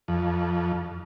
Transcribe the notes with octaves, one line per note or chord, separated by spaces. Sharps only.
F2